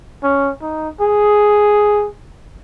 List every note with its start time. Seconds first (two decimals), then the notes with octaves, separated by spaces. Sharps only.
0.23 C#4
0.62 D#4
1.00 G#4